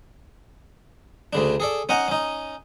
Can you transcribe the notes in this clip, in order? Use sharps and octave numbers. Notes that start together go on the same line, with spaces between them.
D2 C#3 D4
G#4 A4 D5
C#4 D#4 F#5 G#5 A#5
C#4 D#4